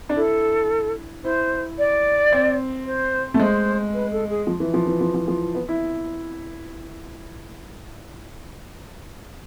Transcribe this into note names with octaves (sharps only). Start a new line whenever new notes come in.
D4
E4 A4
E4 C5
D5
C4
C5
A3
G#3 C5
B4
A4
G#4
F3
E3
F3
E3
F3
F3
F3
B3
E4